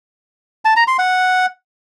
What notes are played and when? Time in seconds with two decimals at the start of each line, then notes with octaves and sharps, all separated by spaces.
0.65 A5
0.76 A#5
0.87 C6
0.99 F#5